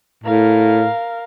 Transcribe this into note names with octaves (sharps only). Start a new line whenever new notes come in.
A2 A#4 F5